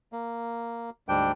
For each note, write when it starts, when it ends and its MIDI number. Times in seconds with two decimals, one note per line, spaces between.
0.13 0.90 58
1.09 1.32 38
1.09 1.32 44
1.09 1.32 55
1.09 1.32 62
1.09 1.32 79